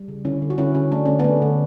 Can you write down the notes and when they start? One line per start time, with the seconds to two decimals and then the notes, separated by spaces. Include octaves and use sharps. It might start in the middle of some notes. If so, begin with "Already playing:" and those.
Already playing: G3
0.08 C#3
0.25 D3 C#4 E4
0.42 D3
0.50 F#4
0.58 D3 C#4 E4
0.75 D3 C#4
0.92 A3 D4
1.06 D3 C#4
1.19 A3 B3 D4
1.42 D3